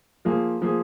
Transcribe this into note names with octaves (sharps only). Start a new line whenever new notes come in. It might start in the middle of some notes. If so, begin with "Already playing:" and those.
F3 A#3 F4 G#4
F3 A#3 F4 G#4